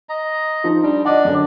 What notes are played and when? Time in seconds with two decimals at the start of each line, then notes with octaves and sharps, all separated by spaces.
0.09 D#5 A#5
0.64 F3 D#4
0.83 G3 D4
1.05 D4 D5 D#5 F#5
1.25 F#2 D3